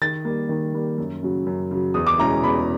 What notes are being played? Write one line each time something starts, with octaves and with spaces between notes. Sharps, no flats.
D#3 A6
G3 A#3
D#3
G3 A#3
F#2
C#3 F#3
F#2
C#3 F#3
E2 D#6
D6
B2 G#3 C#4 E4 A#5
E2 B5